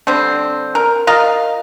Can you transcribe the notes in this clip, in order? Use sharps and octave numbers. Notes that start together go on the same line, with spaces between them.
D3 G3 C4
A#4
F4 A#4 D#5 F5